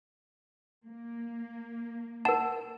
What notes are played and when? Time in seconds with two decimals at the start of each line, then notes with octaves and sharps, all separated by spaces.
0.87 A#3
2.25 A#4 F#5 A5